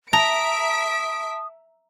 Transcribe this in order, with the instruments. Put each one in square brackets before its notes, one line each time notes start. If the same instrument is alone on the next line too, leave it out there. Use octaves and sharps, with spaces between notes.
[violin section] E5 B6 D7 [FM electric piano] A5 [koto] A#5 [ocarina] D#6